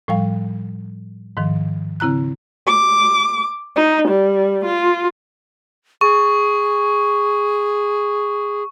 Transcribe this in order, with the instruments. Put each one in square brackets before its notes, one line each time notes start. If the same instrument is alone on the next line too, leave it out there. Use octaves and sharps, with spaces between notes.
[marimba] A2 F3 G3 F5
G#2 D#3 F3
C#3 C4 E4 A#5 F#6
[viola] D6
D#4
G3
F4
[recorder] G#4 [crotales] C#6